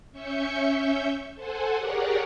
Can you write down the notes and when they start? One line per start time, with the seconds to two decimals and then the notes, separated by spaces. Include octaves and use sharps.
0.12 C#4 E5 C#6 G6 C#7
1.35 A4 C5 F#5 G#5
1.78 G4 G#4 A#4 C#5 D5 F#5